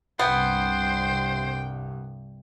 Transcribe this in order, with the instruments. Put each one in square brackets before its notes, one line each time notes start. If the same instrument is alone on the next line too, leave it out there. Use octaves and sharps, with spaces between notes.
[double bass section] C2 G2 [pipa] B3 [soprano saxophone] C5 [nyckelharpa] G5